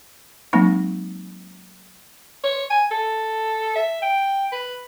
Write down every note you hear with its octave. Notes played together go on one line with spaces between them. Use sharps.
F#3 G#3 A#3 C4 D#4
C#5
G#5
A4
E5
G5
B4